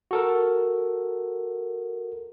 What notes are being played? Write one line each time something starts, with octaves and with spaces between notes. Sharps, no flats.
F#4 A4 A#4